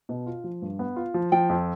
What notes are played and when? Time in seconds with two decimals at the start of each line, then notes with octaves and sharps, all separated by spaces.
0.09 B2
0.26 F4
0.44 F3
0.62 G2
0.79 B3
0.96 F4
1.14 F3
1.32 F3 G5
1.49 F2